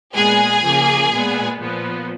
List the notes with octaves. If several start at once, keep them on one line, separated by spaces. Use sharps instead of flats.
A#2 G#3 B3 G#4 G#5
C#3 F3 A#3
A#2 G#3 B3
A#2 F3 B3